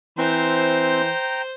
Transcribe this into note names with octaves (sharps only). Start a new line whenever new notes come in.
E3 C4 C5 G5 A#5